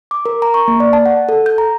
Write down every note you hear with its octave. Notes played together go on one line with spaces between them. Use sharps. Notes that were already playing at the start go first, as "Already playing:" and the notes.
D6
A#4
A#5
C#6
A#3
D5
A5
F#5
A4
G6
A#5